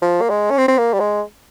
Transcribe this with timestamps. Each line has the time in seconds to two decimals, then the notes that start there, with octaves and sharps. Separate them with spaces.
0.02 F3
0.21 A#3
0.30 G#3
0.51 C#4
0.58 C4
0.68 C4
0.78 A#3
0.93 G3
1.00 G#3